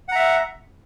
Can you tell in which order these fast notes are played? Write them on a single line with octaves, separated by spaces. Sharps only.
F#5 A#5 E5